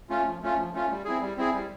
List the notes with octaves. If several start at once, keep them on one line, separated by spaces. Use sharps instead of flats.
A3 C#4 F4
F3
A3 C#4 F4
F3
A3 C#4 F4
G3
C4 E4 G#4
G3
C4 E4 G#4
G3